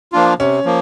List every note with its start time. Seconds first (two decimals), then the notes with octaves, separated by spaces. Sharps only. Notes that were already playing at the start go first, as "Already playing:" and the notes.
0.12 F3 A#3 D4 F4
0.39 C3 C#4
0.65 F3 A#3